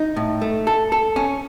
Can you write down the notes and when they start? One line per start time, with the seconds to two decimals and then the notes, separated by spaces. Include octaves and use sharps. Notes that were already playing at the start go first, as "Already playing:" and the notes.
Already playing: D#4
0.17 A2
0.42 A3
0.67 A4
0.92 A4
1.16 C#4